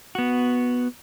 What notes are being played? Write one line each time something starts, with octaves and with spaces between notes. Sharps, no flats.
B3 F#4